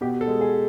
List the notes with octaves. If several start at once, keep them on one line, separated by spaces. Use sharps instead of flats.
B2 G4
A4
G#3
G#4